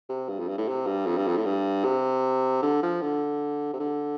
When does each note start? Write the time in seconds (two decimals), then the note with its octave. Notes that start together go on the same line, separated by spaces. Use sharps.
0.09 C3
0.29 G2
0.39 F2
0.48 G2
0.58 A2
0.68 C3
0.87 G2
1.07 F2
1.17 G2
1.27 F2
1.37 A2
1.45 G2
1.84 C3
2.62 D3
2.83 F3
3.02 D3
3.73 C3
3.80 D3